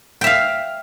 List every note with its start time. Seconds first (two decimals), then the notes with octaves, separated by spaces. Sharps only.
0.21 G5
0.24 E5
0.27 F5